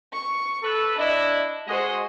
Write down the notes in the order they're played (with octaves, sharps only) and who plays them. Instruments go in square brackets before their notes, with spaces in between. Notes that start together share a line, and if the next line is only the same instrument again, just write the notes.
[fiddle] C#6
[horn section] A4 B4
[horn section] D4 E4 [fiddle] D#5
[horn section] G#3 F#4 D#5 [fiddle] G#4 C5